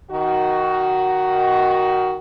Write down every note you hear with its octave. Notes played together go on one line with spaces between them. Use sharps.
D#3 F#4